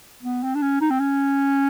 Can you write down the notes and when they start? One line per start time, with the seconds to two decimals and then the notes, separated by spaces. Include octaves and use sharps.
0.23 B3
0.43 C4
0.55 D4
0.62 C#4
0.81 D#4
0.91 C4
0.99 C#4